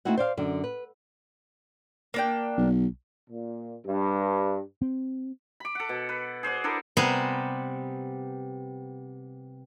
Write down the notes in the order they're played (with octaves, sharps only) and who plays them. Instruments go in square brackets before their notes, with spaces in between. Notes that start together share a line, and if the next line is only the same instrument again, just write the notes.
[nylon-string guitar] A3 C4 D#4 E4 F#4 F#5
C5 D5 F5
F#2 D3
B4
[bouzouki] A#3 D4 G5
[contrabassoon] B1
[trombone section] A#2
G2
[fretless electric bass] C4
[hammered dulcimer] B5 D6
A4 F#5
B2
B4
G#4 C5 D5 F#5
D4 E4 A4 A#4
[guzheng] C3 G3 B3 C5 G#5 A#5